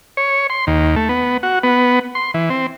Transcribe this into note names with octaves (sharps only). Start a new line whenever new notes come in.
C#5
C6
D#2
A3
B3
F#4
B3
C6
E3
C4